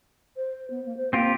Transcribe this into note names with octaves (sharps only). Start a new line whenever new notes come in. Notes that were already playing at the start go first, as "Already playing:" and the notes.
C5
B3
A#3
C5
A#3 C4 F4 G4